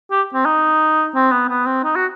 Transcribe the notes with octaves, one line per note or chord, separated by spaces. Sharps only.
G4
C4
D#4
C4
B3
B3
C4
D#4
F#4